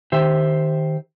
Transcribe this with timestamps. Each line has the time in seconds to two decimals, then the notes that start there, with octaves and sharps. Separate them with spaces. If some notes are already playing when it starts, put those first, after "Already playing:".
0.12 D#3 G4 C5 E5